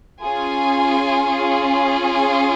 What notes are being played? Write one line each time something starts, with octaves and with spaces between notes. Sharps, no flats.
C#4 F4 G#4 G#5
G#5